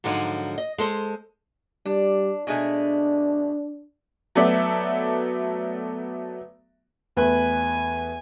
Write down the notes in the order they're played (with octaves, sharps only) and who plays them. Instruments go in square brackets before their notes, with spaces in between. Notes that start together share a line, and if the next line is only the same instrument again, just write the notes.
[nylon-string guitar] G#2 D3 F3 F#3 D#4
D#5
G#3 A4 C5
[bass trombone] G3 [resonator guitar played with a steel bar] D4
[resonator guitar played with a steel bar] B2 G#3 A3 [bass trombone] D4
[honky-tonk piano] F#3 A3 B3 F#4 D5 E5
[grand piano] E2 A3 B4 [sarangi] G#5